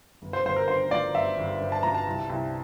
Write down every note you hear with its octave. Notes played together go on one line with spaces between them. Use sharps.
G1
C5
G1 C5
A#4
G2 C5
F3 D5
G1 E5
G1
G2
A5
F3 A#5
A5
C2
C2